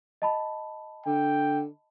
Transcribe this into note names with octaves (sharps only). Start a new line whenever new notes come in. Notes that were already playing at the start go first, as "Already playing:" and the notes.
D#5 A5 B5
D3 G5